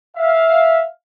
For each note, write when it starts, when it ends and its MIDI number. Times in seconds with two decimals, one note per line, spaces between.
0.17 0.87 76
0.17 0.87 77